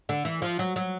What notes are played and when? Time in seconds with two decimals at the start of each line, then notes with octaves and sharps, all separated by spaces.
0.09 D3
0.25 E3
0.42 F3
0.59 F#3
0.76 F#3